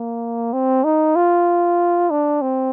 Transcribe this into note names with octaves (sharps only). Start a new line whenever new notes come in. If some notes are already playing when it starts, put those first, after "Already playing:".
Already playing: A#3
C4
D#4
F4
D4
C4